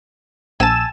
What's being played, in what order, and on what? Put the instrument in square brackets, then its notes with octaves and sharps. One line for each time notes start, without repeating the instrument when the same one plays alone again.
[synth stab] A#1 E6 E7 [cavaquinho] G#5 A5